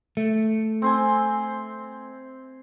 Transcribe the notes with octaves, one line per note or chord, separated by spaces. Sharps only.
A3
C4 C5 G#5